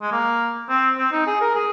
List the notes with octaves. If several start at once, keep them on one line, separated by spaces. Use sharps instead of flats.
G#3
A#3
C4
C4
D#4
G#4
A#4
G#4